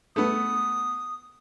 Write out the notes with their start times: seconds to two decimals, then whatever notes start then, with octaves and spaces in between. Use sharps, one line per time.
0.16 A3 B3 D#6